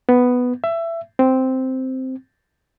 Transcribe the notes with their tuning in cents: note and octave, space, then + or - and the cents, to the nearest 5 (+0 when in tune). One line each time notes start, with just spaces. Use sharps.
B3 +5
E5 +20
C4 -5